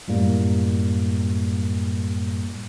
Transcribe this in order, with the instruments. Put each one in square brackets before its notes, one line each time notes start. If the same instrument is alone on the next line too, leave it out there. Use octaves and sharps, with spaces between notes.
[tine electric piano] F#2 A2 G3 A#3